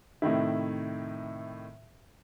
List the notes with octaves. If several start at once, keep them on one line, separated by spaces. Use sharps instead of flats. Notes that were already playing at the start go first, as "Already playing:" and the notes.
A2 C3 D#3 E4